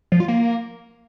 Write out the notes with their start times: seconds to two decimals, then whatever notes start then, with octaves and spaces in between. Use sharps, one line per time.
0.12 F3
0.20 F4
0.28 A#3